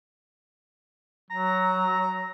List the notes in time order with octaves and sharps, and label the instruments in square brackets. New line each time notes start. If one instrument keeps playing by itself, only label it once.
[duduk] F#3 [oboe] A#5